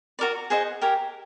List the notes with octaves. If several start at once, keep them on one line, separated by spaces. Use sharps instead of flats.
F#4 A#4 D5
G#4 C5 D#5 F#5
G4 A#4 C#5